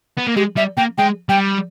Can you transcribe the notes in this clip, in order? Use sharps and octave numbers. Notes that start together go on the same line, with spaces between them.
B3
A#3
G#3 G4
G3 E5
A#3 G5
G#3 G5
G3 G5